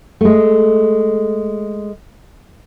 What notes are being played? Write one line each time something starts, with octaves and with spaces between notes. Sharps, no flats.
G#3 A3